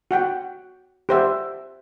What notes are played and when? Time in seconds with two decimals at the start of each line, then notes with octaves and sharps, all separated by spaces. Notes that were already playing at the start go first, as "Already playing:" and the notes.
0.11 F#4 F#5 G5
1.09 G4 C5 E5 F#5